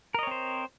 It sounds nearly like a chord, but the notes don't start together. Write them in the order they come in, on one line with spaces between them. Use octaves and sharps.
A#4 D#5 C#5 C4 C5